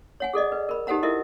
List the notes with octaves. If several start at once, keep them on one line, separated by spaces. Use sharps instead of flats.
C#5 F#5 G#5
G#4 A4 D5 D#5
B4
A#4 B5
D#4 G4 A4 C5 F#5 A#5
E4 F4 A4 A#4 D#5 E5